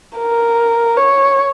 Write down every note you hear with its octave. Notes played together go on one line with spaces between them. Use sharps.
A#4
C#5